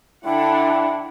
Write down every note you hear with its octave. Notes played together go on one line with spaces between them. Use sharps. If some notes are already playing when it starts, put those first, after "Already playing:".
D3 D4 E4 F#5 G5